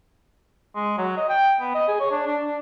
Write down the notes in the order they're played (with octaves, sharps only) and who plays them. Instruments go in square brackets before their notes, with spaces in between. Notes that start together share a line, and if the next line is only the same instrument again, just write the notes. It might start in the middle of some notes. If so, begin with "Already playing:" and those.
[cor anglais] G#3
F#3
D#5
G5
B3
D#5
G#4
C#5
D4
D4
D4